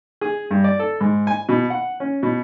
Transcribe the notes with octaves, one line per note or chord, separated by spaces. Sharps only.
G#4
G2
D5
A4
G#2
G#5
B2
F#5
C#4
B2